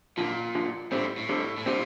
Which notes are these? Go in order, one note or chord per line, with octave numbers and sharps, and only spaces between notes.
F#2 A#2 D3 F3
F#2 D3 F3
F2 A2 D3 G3 C4
A2
F2 D3 G3 C4
A2
A#2 D3 G3 C4